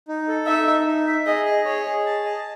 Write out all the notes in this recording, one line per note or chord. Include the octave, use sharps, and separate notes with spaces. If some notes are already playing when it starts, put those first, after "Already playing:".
D#4
A4
D#4 E5
D#4
D#4
E5
G#4 D#5
D#5
G#4 C#5
G#4
A5
D#5